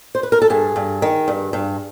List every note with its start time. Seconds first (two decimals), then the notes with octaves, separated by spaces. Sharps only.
0.15 C5
0.23 B4
0.32 A#4
0.42 A4
0.50 G2 G#4
0.76 G2
1.02 D#3
1.28 G2
1.53 G2